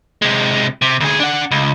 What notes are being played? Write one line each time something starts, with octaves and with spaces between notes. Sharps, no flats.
C3 G#3
C3
D2 G#4
D4 F#5
C#2